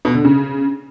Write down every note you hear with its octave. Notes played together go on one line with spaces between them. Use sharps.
B2
D3
C#3